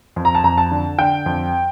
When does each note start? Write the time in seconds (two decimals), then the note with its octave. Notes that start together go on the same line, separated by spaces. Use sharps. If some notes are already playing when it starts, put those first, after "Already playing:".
0.16 F2
0.25 A#5
0.35 A5
0.44 F2 A#5
0.58 A5
0.71 D3
0.99 D3 G5
1.26 F2